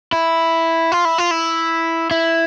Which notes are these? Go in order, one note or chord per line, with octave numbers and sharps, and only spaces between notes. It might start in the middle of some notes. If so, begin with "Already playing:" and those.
E4
F4
E4
F4
E4
E4